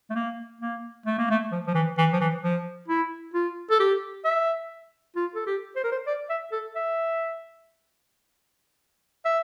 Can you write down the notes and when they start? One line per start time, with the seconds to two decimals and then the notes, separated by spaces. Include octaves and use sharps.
0.10 A3
0.15 A#3
0.61 A#3
1.06 A3
1.18 A#3
1.31 A3
1.52 F3
1.67 F3
1.75 E3
1.98 E3
2.13 F3
2.20 E3
2.43 F3
2.88 E4
3.34 F4
3.71 A4
3.80 G4
4.25 E5
5.16 F4
5.35 A4
5.47 G4
5.76 C5
5.84 A#4
5.92 C5
6.07 D5
6.30 E5
6.52 A4
6.75 E5
9.25 E5